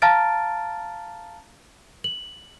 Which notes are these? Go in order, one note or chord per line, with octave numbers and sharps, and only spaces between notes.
F5 A5 A#5 F6 A6 D7
F#7